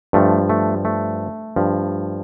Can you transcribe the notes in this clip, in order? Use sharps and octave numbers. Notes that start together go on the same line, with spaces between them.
G2 F3 A3
A3
A3
G2 F3